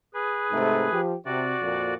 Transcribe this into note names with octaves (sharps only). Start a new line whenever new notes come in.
G#4 B4
G#2 C3 A3
F3 G4
C3 F#4 D5
F2 A#2